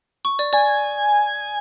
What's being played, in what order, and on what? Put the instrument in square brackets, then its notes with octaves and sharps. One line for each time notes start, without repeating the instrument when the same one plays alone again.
[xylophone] C#6
D5
[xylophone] D5 [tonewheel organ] G#5